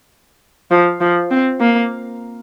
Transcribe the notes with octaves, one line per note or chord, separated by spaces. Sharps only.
F3
F3
C4
A#3